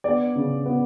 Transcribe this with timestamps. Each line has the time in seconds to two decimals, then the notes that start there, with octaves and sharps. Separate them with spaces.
0.04 B3 D5
0.35 C#3
0.66 B3